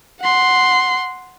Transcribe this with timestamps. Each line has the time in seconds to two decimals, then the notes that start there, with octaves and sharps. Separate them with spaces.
0.21 F#5 C6